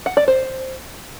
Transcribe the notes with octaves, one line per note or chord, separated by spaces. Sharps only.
F#5
D5
C5